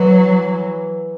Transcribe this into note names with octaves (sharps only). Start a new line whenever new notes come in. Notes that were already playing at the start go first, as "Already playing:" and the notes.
Already playing: E3 F#3